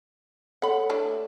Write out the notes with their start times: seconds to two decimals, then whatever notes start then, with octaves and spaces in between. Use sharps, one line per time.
0.62 A4 C#5 F#5 B5
0.89 A3 D4 E4